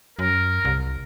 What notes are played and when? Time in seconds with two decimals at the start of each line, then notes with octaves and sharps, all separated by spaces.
0.19 F#2 A#4
0.65 C2